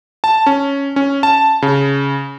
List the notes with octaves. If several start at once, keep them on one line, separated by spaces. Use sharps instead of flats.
A5
C#4
C#4
A5
C#3